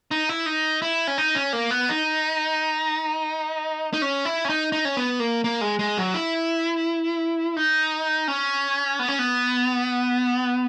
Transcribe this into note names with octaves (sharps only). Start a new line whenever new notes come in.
D#4
E4
D#4
E4
C#4
D#4
C#4
A#3
B3
D#4
D#4
C#4
E4
C#4
D#4
D#4
C#4
B3
A#3
A#3
G#3
G#3
F#3
E4
D#4
C#4
B3
C#4
B3